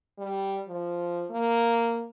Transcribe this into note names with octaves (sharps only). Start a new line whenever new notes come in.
G3
F3
A#3